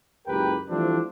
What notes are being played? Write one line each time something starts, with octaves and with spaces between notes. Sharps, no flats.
F#1 C#2 G4 A#4 B4 G5
E3 F3 G3 A3 C4 D4